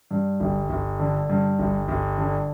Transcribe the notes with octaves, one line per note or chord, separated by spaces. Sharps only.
G2
G1
G1
D3
G2
G1
G1
D3